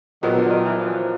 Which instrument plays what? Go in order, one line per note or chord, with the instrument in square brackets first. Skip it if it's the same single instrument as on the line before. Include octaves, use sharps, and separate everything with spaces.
[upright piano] A#2 F#3 B3 [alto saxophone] D#3
[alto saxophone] D3
D#3
E3
F3